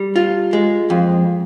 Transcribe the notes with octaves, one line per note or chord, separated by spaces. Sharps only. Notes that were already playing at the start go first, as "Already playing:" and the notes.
Already playing: G3
F4
G#3
F2